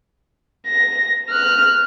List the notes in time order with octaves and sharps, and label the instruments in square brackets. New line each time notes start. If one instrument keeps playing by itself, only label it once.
[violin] A#6
F6 F#6